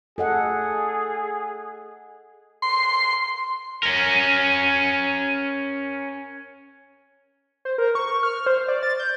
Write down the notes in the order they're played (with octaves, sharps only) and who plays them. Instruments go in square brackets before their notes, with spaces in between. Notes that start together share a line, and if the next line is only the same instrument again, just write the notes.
[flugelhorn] G#4 [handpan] A4 D#5 F#5
[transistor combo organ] C6
[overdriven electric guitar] C#4 A#4
[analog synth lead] C5
A#4
C#6
F6
C5
D5
A6
G6